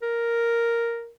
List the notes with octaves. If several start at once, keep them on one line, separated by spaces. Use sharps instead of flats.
A#4